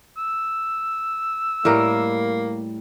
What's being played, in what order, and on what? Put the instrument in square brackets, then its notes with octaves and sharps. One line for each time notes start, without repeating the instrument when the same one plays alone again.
[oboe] E6
[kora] A2 G3 A#4 [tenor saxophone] A#3